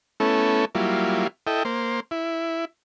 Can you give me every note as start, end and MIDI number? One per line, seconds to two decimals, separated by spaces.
0.20 0.65 57
0.20 0.65 59
0.20 0.65 61
0.20 0.65 64
0.20 0.65 69
0.75 1.27 54
0.75 1.27 55
0.75 1.27 58
0.75 1.27 64
0.75 1.27 65
1.47 1.63 64
1.47 1.63 69
1.47 1.63 75
1.47 1.63 79
1.65 2.00 58
1.65 2.00 72
2.11 2.65 64